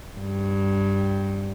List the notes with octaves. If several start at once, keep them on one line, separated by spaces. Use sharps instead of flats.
G2